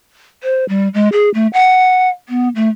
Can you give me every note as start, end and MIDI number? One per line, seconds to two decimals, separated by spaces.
0.43 0.65 72
0.69 0.88 55
0.94 1.09 56
1.13 1.29 68
1.34 1.47 57
1.53 2.09 78
2.29 2.49 59
2.55 2.69 57